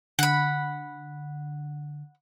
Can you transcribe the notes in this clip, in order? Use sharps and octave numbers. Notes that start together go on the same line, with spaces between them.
D3 F#5 B5